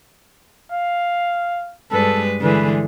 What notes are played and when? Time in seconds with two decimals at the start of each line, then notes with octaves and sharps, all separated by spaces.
0.71 F5
1.92 G2 G#3 A4 B4
2.41 D3 E3 G#3 B4